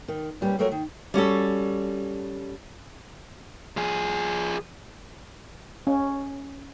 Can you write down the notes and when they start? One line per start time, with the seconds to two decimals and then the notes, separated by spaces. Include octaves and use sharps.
0.08 D#3
0.41 A#2 G3 C#4 G#4 B4
0.59 F3 G3 A3 F#4 A#4 C#5
0.72 D#3
1.14 G3 C#4 F#4 A4
3.77 F3 G#4
5.87 C#4